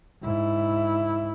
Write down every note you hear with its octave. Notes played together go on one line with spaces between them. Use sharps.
G#2 E4